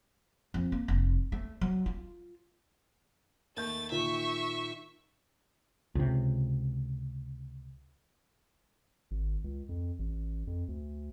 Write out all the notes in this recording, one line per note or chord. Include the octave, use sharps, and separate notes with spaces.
F2
A#3
F1
A3
F#3
F4
D#2 A3 G6 A6
A#2 D#3 E5 C#6
C#2 C3
G#1
C#2
F2
A1
F2
D2